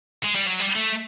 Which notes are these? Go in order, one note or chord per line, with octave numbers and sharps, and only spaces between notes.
G#3
G3
F#3
G3
A3